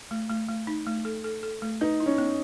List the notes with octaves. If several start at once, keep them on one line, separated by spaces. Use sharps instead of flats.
A3
A3
A3
D#4
A3
A4
A4
A4
A3
D#4 B4
E4
C#4
B3